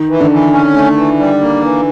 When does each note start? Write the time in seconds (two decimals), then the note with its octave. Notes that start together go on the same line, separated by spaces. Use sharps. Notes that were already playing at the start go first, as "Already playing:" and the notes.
Already playing: D#3
0.09 E3
0.20 D3
0.31 E3
0.53 C#4
0.74 A3
0.97 E3
1.19 G3
1.41 A#3
1.62 E3